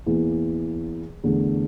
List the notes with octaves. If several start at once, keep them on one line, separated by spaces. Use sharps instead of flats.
E2 E3 A#3
E2 D3 A3